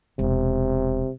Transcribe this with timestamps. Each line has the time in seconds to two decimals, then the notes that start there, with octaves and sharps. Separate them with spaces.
0.19 E1 C3